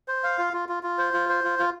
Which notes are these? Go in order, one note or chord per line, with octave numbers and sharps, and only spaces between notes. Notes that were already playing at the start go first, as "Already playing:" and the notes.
C5
F5
F4
F4
F4
F4
C5
F4
C5
F4
F4